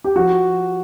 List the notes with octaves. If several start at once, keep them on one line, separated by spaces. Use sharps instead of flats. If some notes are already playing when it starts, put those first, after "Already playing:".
G4
F3 F#4